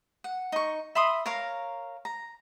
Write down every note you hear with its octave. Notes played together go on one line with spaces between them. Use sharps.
F#5
D#4 C#6
E5 B5 C6 D#6
A#4 C#5 F5 A#5
A#5